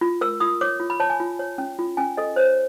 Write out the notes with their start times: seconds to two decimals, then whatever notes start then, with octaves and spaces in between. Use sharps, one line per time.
0.01 F4
0.21 A#4 E6
0.40 F4 D#6
0.61 C#5 D6
0.80 F4
0.90 B5
1.00 C#5 A5
1.10 G#5
1.20 F4
1.39 C#5
1.58 C#4
1.79 F4
1.97 C#4 G#5
2.17 A4 D#5
2.36 C5 C#5